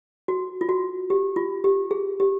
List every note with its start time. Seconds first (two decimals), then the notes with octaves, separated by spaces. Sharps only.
0.28 F#4
0.61 F4
0.69 F#4
1.10 G4
1.36 F4
1.64 G4
1.91 G#4
2.20 G4